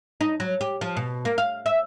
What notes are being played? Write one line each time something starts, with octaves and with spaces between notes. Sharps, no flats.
D#4
F#3
G4
F3
B2
A#3
F5
E5